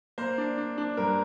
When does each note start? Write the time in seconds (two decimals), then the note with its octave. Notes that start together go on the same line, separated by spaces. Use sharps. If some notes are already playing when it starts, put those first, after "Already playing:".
0.18 A#3 C5
0.38 D4
0.58 D4
0.78 D4
0.97 G2 A#4